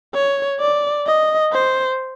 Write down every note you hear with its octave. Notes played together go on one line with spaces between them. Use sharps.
C#5
D5
D#5
C5